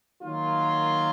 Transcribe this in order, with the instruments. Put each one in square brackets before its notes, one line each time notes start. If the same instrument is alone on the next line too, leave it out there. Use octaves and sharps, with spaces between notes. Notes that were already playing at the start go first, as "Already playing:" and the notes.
[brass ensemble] D#3 F#3 A#3 F4